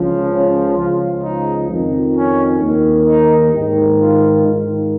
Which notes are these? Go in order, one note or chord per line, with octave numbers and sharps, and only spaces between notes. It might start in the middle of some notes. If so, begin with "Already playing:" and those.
Already playing: C#2 C#3 F3
C#4
C#2 C#3 F3 F4
D#4
F2 D#3
C#4
D#2 D#3
D#4
G#2 D#3
F4
G#2 D#3